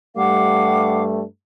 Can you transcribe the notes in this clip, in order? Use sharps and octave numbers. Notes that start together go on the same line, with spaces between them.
G2 G3 A3 F5 F#5 D6